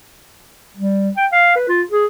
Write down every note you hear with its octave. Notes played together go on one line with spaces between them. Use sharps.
G3
G5
F5
B4
F4
G#4